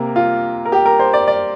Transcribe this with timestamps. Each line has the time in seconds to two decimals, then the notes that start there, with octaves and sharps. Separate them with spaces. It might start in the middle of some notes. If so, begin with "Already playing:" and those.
Already playing: C3 A#3 A#4
0.16 F4
0.65 A#4
0.72 G4
0.86 A#4
0.99 C5
1.13 D5
1.28 D5